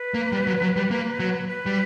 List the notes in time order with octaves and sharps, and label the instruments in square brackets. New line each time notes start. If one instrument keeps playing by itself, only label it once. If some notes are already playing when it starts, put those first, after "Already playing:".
Already playing: [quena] B4
[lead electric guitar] A#3
G3
F#3
F#3
G3
A#3
F#3
[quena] B4
[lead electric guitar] G3